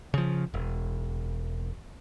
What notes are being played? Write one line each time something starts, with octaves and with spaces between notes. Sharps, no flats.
C#3 F3
E1